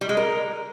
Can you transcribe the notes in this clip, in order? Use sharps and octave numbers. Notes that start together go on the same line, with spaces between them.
G3
G#3
A#4